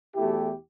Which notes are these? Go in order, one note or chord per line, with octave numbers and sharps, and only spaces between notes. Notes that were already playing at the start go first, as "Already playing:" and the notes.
E2 B2 A3 E4 G4